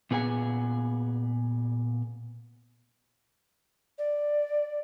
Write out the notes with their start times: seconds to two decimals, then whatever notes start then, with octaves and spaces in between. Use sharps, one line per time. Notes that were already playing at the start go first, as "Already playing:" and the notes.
0.11 A#2 B3 G#4 C5 G#5
3.98 D5